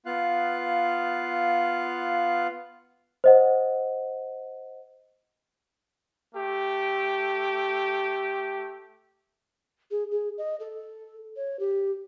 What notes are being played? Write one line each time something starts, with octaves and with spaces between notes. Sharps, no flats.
B3 F4 F5 F#6
C5 D#5 F#5
A3 G4
G#4
G#4
D#5
A4
C#5
G4